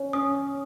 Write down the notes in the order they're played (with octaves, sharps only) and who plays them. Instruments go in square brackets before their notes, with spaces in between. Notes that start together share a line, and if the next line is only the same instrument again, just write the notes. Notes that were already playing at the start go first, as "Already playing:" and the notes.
Already playing: [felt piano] C#4 [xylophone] C#5
[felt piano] C#4 [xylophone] D#6